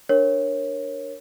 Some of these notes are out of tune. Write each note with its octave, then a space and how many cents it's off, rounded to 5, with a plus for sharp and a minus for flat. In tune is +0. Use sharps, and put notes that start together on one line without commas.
D4 +0 A#4 +0 C#5 -15